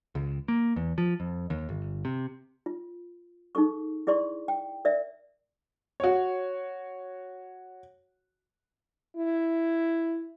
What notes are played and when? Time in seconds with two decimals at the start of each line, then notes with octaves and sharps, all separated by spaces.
0.15 C#2
0.48 A#3
0.76 E2
0.98 F3
1.20 F2
1.50 D#2
1.69 G1
2.05 C3
2.66 F4
3.55 D#4 G#4 A4 C#6
4.07 E4 G#4 D5 C6 C#6
4.48 G5
4.85 A#4 D5 E5
6.00 F#4 C#5
9.16 E4